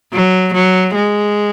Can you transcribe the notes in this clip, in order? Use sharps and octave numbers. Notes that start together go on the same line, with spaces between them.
F#3
F#3
G#3